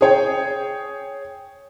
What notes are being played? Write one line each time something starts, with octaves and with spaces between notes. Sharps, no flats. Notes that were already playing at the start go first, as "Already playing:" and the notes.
G#4 C#5 G5